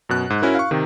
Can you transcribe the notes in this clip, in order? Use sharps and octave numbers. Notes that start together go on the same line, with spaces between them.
F#2 B2 F#6
G#2
C#4 E4 F#4 A#4
F5 C#6
C3 D#3